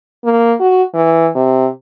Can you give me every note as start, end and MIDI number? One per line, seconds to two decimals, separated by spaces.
0.24 0.55 58
0.60 0.83 66
0.94 1.29 52
1.35 1.68 48